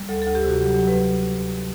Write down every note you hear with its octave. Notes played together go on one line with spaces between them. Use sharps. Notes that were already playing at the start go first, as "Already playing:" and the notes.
Already playing: G3
D2 A4
D2 A4
G4
C3 F#4
F#3 G4
F#3 G4
B4